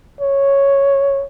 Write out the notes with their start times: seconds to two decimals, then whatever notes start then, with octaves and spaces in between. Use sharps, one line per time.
0.21 C#5